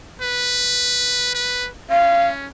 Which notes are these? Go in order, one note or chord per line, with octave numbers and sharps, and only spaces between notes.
B4
B4
C#4 F5